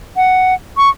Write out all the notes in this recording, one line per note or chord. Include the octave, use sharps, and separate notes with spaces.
F#5
C#6